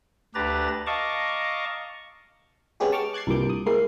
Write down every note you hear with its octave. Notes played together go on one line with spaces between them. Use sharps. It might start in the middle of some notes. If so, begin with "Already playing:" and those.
D2 D4 G4 B4 A#5 A6
D#5 F5 A5 A#5 C#6 D6
G#3 B3 C#4 G4 G#4
A5 C#6 D6 F6 G6 A6
D6 F#6 G#6 A6 C7
C2 G2 A#2 D6 G6
D#6
G#3 A#3 E4 C7